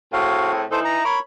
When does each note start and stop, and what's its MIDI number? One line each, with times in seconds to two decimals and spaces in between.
0.13 0.65 45
0.13 0.65 60
0.13 0.52 66
0.13 0.65 68
0.13 0.52 77
0.72 1.01 52
0.72 1.01 63
0.72 1.01 64
0.72 0.80 69
0.72 0.80 72
0.85 1.04 82
1.05 1.19 70
1.05 1.19 73
1.05 1.19 83